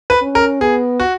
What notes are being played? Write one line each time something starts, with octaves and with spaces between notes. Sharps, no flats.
B4
C#4
A#4
B3 G#4
F#4